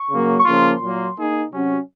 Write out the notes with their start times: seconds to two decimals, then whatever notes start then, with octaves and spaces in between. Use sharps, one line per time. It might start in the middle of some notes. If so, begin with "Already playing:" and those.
Already playing: C#6
0.10 C#3 F#3 A#3
0.39 C#6
0.45 C#3 F3 A#3 C#4 F4 C6
0.80 A#2 F#3 A#3
1.15 A#3 D#4 G#4
1.51 C3 F#3 C#4 F#4